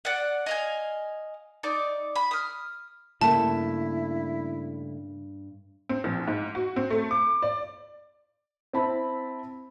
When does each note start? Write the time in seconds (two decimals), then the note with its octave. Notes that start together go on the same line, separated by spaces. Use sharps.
0.05 D5 F#5
0.46 D#5 F5 G#5
1.63 D#4 D5 D6
2.16 B5
2.31 D#6 F6
3.21 G2 C#3 G3 A3 A#3 E4 A5
5.89 C4
6.04 A#1
6.28 G#2
6.55 F#4
6.76 C4
6.90 A3
7.11 D6
7.42 D5
8.73 C4 E4 A5 B5